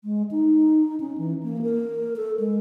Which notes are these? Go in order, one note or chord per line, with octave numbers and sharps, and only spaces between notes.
G#3
D#4
C#4
E3
A#3
A#4
A4
G#3